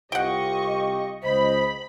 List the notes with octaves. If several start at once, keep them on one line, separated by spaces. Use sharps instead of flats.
C2 F4 G4 D#5 F#5 G5 C#6
C#2 C5 D#5 B5